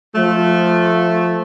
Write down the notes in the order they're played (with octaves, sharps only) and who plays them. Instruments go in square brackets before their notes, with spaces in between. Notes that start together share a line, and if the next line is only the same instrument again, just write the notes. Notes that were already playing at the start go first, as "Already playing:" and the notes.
[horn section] F3 A3